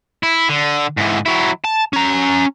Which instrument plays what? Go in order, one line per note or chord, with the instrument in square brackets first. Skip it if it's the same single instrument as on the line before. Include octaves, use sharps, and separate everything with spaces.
[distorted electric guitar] E4
D3
G#2 E3
F#3 E4
A5
C#4 A#5